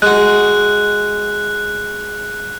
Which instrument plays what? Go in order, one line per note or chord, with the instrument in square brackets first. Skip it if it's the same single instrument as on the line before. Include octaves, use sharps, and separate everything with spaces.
[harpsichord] G#3 F#4 [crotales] F#6